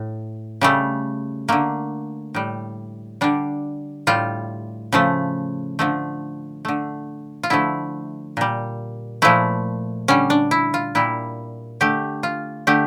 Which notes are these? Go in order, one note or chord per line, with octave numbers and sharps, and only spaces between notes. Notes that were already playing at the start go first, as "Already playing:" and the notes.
Already playing: A2
C#3 G3 A3
D3 A3 A#3
A2 G3
D3 G3 D4
A2 G3 F4
C#3 F3 A3
D3 F3 A3
D3 A3
F4
D3 F3 A3 E4
A#2 G3
A#2 F3 A3 E4
D3 G3 C#4
D4
E4
F4
A#2 G3 E4
D3 A3 G4
F4
D3 A3 G4